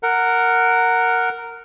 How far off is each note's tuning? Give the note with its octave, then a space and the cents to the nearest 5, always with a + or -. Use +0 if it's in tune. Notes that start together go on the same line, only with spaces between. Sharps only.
A#4 -10 F#5 +0